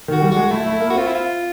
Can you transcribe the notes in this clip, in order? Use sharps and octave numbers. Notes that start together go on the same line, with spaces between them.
D#3
F#4
G3
G#3 F#4
A3 E4
A3
E4
A#3
F#4
C4 F4
E4
F4